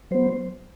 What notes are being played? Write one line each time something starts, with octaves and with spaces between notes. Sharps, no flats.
F#3 B3 C5